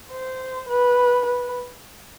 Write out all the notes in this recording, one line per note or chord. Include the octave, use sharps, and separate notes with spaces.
C5
B4
B4